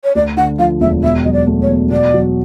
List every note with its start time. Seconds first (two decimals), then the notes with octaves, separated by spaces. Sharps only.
0.04 C#5
0.15 D2 D5
0.37 D3 F#5
0.59 F3 F5
0.80 E1 E5
1.03 B2 E5
1.24 F#3 D#5
1.33 D5
1.47 A3
1.62 C#5
1.69 E2
1.91 B2 D5
2.14 F#3